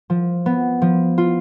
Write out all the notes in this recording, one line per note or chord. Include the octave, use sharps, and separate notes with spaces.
F3
B3
F3
F4